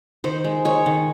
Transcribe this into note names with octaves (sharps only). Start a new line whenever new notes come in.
D#3 C5
G#3
G#3 C#5
D#3